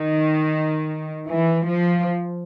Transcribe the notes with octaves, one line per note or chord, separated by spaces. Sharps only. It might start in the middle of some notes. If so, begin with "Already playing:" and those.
Already playing: D#3
E3
F3